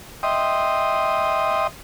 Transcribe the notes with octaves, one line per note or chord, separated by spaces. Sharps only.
D#5 E5 G5 C6 D#6